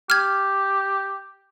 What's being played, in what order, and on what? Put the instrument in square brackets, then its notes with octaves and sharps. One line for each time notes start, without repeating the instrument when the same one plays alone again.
[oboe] G4 [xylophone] F6 G#6